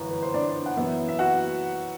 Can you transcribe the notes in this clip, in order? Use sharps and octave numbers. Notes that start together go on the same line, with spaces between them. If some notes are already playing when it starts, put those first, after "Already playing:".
Already playing: G1 F#2 E3 B4
B4
C5
D4 D5
F#5
F#2 E3 B3 E4 E5
E5
F#4 F#5